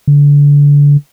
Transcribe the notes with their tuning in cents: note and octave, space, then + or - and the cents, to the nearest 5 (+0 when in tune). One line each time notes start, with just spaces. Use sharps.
D3 -30